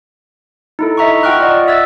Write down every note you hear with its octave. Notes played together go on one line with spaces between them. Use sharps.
D#4 E4 A4
D#5 E5 A#5 B5 C#6
F4 F#5 G5 C#6 F6 F#6
D5 D#5 F#5
E5 E6 G#6 A6